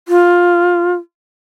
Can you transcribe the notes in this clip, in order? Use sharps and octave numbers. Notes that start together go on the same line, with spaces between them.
F4